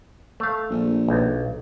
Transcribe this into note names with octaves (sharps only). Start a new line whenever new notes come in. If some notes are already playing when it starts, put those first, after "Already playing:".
A3 F5
A#1
B1